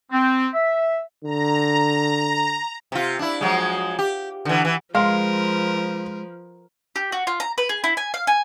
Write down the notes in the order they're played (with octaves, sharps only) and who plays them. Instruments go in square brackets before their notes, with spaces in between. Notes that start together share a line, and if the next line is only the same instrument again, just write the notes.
[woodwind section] C4
E5
[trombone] D3 [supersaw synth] A#5
[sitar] C3 F4
D4 E4
F3 F#3 G#3
G4
D3 E3
E3
[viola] F3 [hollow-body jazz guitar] G#3 [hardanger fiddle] A#4 B4 [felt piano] F5 C6 F6
[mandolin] G4
F#4
F4
A#5
B4
G#4
E4
G#5
F5
G#5